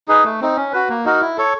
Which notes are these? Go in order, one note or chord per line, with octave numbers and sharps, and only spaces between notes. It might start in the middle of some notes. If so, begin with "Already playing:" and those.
D#4 G#4 B4
A3
C4 D#4
C#4
F#4 B4
A#3
D#4 F#4 A#4
E4
A4 C#5